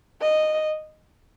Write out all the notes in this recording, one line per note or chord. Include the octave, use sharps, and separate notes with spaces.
D#5